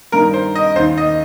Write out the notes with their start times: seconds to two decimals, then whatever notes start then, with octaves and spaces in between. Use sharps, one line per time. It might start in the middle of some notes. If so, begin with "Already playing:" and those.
0.12 G2 D#3 A#4
0.34 C5
0.55 D#5
0.76 D#2 C5
0.80 D#3
0.98 D#5